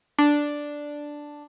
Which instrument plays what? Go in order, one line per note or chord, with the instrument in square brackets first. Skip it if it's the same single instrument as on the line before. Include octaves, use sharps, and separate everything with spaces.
[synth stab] D4